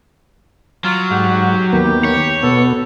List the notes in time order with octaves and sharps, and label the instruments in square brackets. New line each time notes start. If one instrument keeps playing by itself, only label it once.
[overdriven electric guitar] F#3 [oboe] F4
[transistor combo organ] G#2 F#5 [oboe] G4
[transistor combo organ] D#2 A#3 B3 [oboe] G4
[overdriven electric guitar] C#5
[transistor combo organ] B2 B3 [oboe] A4